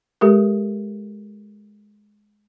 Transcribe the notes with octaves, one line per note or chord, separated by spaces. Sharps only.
G#3 G4 A4 A#4